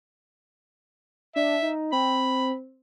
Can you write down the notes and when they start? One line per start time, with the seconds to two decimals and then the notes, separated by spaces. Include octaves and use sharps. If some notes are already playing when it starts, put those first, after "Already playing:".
1.36 D4 E5
1.62 D#4
1.93 C4 B5